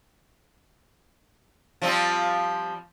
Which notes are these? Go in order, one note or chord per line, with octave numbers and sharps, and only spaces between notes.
F3 G3 C4